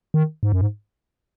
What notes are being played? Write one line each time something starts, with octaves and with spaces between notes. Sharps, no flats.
D#3
G#2
F#2
G#2